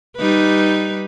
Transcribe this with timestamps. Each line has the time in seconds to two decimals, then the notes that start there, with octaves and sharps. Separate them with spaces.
0.17 G3 D#4 B4